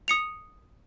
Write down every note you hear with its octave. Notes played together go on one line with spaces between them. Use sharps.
D#6 C#7 F7